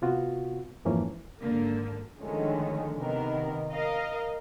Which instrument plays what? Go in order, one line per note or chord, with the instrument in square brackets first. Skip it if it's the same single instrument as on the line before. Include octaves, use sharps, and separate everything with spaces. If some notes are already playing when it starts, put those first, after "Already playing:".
[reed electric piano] C3 B3 F4 F#4
F2 G#2 E3 F3 A#3 C#4
[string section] G#1 D3 [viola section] A#3
[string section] D3 D#3 F3 G#3 A3 C#4
C3 D#3 B3 A#4
A#4 D#5 F5